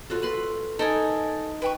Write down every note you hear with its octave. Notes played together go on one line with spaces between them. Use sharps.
F4 F#4 A4
B4 B5 C6
D#4 A4 A#4 G#5
B4 G5 C#6